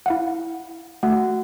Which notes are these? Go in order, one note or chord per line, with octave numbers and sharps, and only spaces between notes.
E4 F5 F#5
A3 F#4 F#5